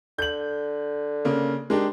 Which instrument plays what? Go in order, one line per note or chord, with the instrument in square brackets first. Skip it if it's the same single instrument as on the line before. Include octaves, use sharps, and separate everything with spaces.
[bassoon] D3 [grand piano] G6 F#7
[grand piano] C#3 A#3
[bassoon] D#3 [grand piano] G#3 D4 G4